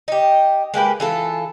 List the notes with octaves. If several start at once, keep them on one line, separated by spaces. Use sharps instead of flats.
D#4 G4
G#3 A#3 G4 B4
E3 F4 A4